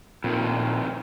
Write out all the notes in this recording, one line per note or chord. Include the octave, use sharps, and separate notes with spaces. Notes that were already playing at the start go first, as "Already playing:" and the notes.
F2 A#2 D#3